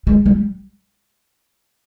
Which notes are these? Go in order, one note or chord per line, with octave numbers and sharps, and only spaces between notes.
G#3
G3